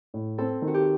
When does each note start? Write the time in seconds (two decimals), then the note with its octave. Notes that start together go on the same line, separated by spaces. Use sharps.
0.14 A2
0.38 C4 A4
0.62 D#3
0.68 F#4
0.74 G4